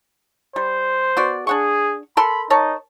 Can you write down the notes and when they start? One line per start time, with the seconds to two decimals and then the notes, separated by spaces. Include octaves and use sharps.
0.56 G3 C5
1.17 B3 F#4 D5
1.47 D4 G#4 F#5 C#6
2.17 A4 A#4 B5 C6
2.50 D#4 A#4 C#5 A5